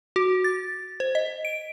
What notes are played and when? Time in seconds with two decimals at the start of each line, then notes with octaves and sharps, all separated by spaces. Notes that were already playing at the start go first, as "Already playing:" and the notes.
0.16 F#4
0.44 A6
1.00 C5
1.15 D#5
1.45 D7